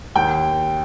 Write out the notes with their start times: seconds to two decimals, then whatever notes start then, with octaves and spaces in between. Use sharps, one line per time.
0.16 D#2 G5